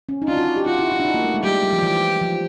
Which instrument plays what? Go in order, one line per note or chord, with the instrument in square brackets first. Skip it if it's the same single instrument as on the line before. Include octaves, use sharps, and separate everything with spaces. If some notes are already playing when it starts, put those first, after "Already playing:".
[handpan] C#4
D#4
[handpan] D4 [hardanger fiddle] F4
[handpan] F#4
G4
[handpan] F4 [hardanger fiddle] F#4
[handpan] E4
E4
D4
D#4
A#3
A3
G#3
[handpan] G3 [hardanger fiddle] G4
[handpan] G3
F3
E3
F3